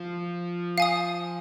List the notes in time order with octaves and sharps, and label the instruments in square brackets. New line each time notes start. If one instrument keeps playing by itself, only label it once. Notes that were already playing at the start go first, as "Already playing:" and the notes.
Already playing: [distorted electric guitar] F3
[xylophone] F5 G#5 D#6